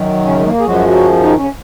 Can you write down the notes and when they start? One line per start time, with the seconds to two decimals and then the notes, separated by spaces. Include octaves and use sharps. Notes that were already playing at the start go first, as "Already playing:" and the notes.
Already playing: F#2 D#3 F#3
0.24 C#3 C#4
0.39 G#3
0.46 A#3
0.60 G#4
0.66 F#2 F3 F#3 G#3 F#4
0.88 F#3 F#4
1.22 D#3 D#4
1.37 C#3 C#4